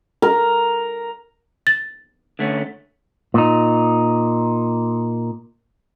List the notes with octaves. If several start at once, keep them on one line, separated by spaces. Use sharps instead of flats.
A#4
A6
D3 A3 C#4
A#2 D#4